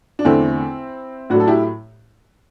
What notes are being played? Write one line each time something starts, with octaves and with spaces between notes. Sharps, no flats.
D4
E2 D3 A3 C4 E4
A2 F#3 A3 D4 F#4
A4
E4 G4